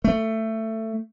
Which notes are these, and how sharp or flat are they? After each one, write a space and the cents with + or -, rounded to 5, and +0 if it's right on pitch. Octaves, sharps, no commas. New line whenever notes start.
A3 +15